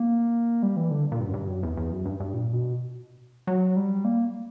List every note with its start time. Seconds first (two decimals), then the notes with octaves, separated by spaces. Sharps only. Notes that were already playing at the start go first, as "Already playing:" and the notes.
Already playing: A#3
0.63 G3
0.77 E3
0.90 D3
1.12 A#2
1.20 G2
1.28 F#2
1.34 G2
1.48 F#2
1.63 E2
1.77 E2
1.92 F#2
2.06 G2
2.20 G2
2.34 A#2
2.53 B2
3.47 F#3
3.76 G3
4.04 A#3